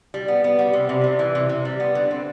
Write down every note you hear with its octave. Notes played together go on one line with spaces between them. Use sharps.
G3
B3
B3
G3
C3
C3
G3
E3
C3
C3
G3
B3
D3
C4